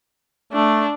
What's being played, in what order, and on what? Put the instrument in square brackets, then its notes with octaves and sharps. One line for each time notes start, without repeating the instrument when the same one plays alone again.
[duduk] A3 [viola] D4